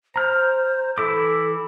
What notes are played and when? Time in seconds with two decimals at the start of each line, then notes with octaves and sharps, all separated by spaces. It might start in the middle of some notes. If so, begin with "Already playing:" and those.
0.16 C5 A#5 F6
0.98 E3 E4 A4 D6